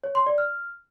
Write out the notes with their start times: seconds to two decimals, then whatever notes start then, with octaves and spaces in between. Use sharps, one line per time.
0.04 C#5
0.15 C6
0.27 D5
0.38 F6